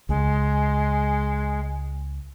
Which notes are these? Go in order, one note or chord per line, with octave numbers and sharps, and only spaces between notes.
C#2 G#3